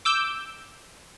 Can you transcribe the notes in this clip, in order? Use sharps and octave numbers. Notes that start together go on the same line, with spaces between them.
D6 E6 G6